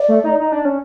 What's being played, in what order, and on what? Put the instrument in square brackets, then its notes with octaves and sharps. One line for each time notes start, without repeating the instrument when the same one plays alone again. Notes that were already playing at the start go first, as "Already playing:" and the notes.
Already playing: [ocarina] D5
[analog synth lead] A3
D#4
D#4
D4
C#4